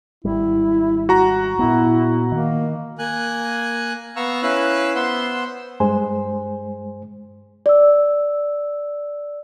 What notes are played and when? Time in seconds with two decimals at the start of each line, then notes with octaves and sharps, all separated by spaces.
0.25 G#1 G3 E4
1.09 F#4 A#5
1.59 A#2 B3 E4
2.32 D#3 A#3
2.99 A#3 G#5 F#6
4.16 B3 F5 A#5 C#6 E6
4.43 C#4 E4 B4 F5 E6 F#6
4.95 B3 C5 F#5 C6 E6
5.80 G2 G#3 C5 G#5
7.66 D5 E6